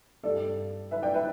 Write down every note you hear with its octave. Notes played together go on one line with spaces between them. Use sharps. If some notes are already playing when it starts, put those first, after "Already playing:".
G2 G3 A4 D5
B4 E5
D5 G5
B4 E5